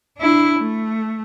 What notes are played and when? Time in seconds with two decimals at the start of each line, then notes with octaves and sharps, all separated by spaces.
0.18 D4 E4
0.59 A3